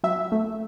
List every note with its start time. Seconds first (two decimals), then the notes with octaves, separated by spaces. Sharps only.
0.04 F#3 E5
0.32 A3